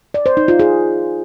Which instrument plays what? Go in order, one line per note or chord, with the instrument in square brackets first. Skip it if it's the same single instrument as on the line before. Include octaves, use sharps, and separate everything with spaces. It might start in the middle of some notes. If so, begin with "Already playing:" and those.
[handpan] D5
C5
D#4
F4
G#4